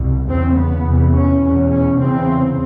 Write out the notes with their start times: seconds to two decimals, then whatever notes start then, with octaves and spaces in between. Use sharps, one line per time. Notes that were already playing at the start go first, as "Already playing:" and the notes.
Already playing: C2 B2
0.28 E2 C#3 C4
0.57 B3
0.85 E2 C3
1.14 C#4
1.42 E2 B2
1.70 C#4
1.98 E2 C#3 C4